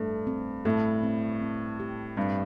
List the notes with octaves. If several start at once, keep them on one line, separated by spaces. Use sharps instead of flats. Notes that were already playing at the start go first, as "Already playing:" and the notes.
Already playing: G2 A3 D4
C4
A2 A4
C4
C4
G4
G2 C4